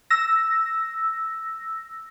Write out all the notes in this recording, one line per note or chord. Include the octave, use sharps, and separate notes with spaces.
E6 A#6